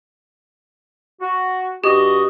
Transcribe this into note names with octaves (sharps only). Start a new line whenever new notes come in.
F#4
G2 F#4 G4 D#5